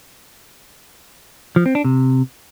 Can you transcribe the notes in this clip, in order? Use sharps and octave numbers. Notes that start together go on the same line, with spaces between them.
F3
C4
D4
C3